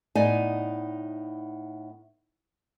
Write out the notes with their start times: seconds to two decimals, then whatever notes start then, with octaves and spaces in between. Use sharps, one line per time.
0.15 A2 B3 D#4 D5 D#5 G#5